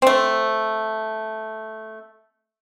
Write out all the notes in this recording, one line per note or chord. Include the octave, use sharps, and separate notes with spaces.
A3 C4